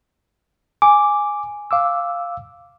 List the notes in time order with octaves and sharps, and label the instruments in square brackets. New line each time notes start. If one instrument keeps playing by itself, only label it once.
[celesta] G#5 [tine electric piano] D6
[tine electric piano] F5 D6 E6